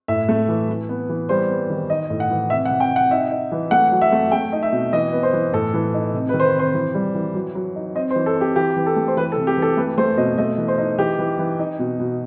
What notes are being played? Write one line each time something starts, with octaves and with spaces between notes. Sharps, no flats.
A2 E5
A3
E3
E3
B3
E3
G3 C5
B3
D#3
D#4 D#5
A2
F#5
E3
C3 E5
F#5
C3
G5
C3
F#5
D#4 E5
D#4
E3
A3 F#5
F#3
E5
A3
A3 G5
D#4
E5
B2
E3 D#5
B3
C5
E3
A2 A4
E3
D#4
C3
B4
D#3
C5
B4
C3
C5
E3
G3
E3
F#3
F#3
D#4
C4 D#5
C5
E3
A4
C4
G4
E3 G4
E3
A4
A3
C5
E3 B4
A4
C3
G4
E3 A4
A3 B4
A3 C5
B2 D#5
A3 D#5
E3
C5
D#4
E3 G4
E3
E3
D#4
B2
B2